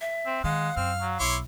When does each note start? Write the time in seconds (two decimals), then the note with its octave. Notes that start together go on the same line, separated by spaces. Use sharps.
0.01 E5
0.26 C4
0.44 D#3 G#3 F5 F#5
0.76 F#2 C4 F6
1.01 F#3
1.20 B1 E4 C#5 C6 D6